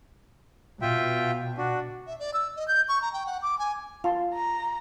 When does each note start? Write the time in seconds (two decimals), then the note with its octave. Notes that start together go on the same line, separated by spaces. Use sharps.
0.82 B2 F4 E5 G5
1.58 D4 F#4
2.07 E5
2.19 D5
2.34 E6
2.56 D#5
2.68 G6
2.89 C#6
3.02 A#5
3.13 G5
3.26 F#5
3.42 D6
3.59 G#5
4.04 F4 F5 A5 C6
4.34 A#5